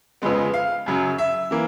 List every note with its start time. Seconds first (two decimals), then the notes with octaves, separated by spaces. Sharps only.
0.22 F2 C#3 F3 G#3 B3
0.54 F5
0.86 F#2 C#3 F#3
1.18 E5
1.51 E3 A#3